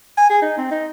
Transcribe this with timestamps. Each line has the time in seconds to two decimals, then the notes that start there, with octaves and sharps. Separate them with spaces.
0.17 G#5
0.30 G#4
0.42 D#4
0.57 C4
0.71 D#4